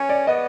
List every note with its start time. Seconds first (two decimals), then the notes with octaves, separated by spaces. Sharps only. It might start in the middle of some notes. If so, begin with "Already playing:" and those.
Already playing: C#4 C#5
0.09 D5
0.27 B3 D#5